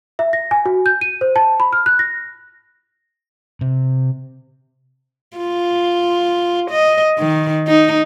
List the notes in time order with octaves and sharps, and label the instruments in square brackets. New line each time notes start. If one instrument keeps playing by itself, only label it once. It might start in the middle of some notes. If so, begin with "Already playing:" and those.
[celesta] E5
A#6
G#5
F#4
G6
D#7
C5
A5
B5
F6
F#6
A#6
[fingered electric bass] C3
[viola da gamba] F4
D#5
D#3
D#4